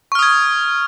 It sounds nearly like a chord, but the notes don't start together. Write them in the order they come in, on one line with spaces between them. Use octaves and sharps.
C#6 F6 D#6 G#6